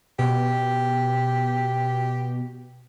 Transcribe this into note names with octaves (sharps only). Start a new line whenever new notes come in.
B2 G4